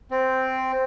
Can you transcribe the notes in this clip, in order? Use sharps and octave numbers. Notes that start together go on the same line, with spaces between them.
C4